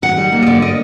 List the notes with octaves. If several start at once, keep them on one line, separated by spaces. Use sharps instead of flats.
D#3 F#5
G3
A#3
D#5
D3 D5
A#3 D#5